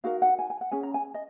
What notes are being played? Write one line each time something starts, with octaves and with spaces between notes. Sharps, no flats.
D#4 F#4 A#4 F5
F#5
G#5
G#5
F#5
C#4 G#4 G#5
A#5
G#5
D#5